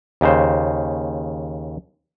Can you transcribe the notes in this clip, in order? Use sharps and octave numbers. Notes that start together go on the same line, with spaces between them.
D#2 C#3 C5